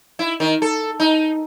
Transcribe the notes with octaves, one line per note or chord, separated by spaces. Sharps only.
E4
D#3
A4
D#4